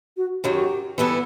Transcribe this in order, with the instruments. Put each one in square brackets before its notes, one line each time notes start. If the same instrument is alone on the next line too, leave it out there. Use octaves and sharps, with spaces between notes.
[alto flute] F#4
[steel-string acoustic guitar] F#2 D#3 F#3 [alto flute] G4
[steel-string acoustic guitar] E3 G3 B3 E4 A4